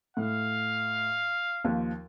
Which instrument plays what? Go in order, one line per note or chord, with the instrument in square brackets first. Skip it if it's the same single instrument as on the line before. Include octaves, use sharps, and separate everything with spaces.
[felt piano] A2 [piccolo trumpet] F5
[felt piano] D#2 F3